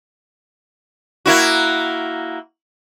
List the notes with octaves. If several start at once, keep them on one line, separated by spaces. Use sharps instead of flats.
A#3 E4 F#4